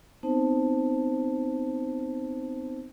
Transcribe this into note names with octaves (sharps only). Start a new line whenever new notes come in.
B3 C4 D#4 C5 A5